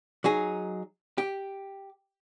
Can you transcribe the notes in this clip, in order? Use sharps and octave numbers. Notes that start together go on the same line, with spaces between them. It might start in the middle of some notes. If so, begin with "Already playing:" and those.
F#3 D#4 G#4
G4